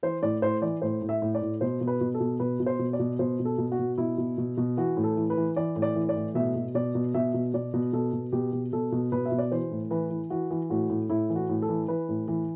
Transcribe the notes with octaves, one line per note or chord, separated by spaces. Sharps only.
E3 C5
A2 D5
A2 C5
E3 D5
A2 C5
A2
E5
A2
D5
A2
B2 C5
B2
B4
B2
A4
B2
B2 B4
B2
C5
B2
D5
B2
B2 C5
B2
A4
B2
F#4
B2
B2 E4
B2
B2
B2
E3 F#4
A2
A4
E3
B4
E3
E3 D5
A2
D5
E3
D5
A2
B2 E5
B2
B2 D5
B2
B2 E5
B2
B2 D5
B2
B2 A4
B2
B2 G4
B2
B2 A4
B2
B2 B4
E5
B2
D5
E3 C5
A2
E3 B4
E3
E3 F#4
E3
A2 F#4
A2
A2 E4
E3
F#4
A2
A4
E3
E3 B4
A2
E3